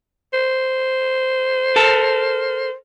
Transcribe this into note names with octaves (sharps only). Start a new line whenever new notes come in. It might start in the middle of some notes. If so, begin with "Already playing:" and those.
C5
A4 A#4 A5